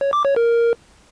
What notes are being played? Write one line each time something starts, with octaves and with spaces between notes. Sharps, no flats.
C#5
D6
C#5
A#4